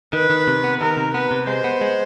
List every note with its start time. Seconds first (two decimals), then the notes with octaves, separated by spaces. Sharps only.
0.13 D#3 B4
0.30 D#3
0.48 C3
0.64 B3
0.81 D#3 A#4
0.97 C3
1.14 B3 B4
1.31 C3
1.47 G#3 C5
1.64 B3
1.81 G#3